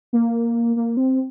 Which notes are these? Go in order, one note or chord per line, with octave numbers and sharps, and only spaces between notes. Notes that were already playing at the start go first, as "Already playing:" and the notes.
A#3
A#3
C4